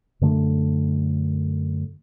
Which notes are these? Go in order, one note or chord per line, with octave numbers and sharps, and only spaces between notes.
F#2 D3 A3